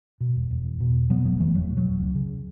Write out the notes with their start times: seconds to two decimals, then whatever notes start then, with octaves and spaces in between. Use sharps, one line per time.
0.20 B2
0.36 E1
0.51 E1
0.65 E2
0.80 B2
0.95 E1
1.10 B2 F#3 B3
1.25 F#1 F#3 B3
1.40 F#1 E3 A3
1.55 E2 F#3
1.70 B2
1.77 F#3
1.85 F#1
2.00 C#2
2.15 C#3